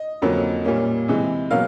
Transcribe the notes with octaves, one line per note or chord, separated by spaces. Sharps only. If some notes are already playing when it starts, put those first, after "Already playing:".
Already playing: D#5
F2 D3 F#3 A#3 C#4
A#2 G3 A#3 C#4
C3 E3 G#3
B2 F#3 A#3 C#4 F5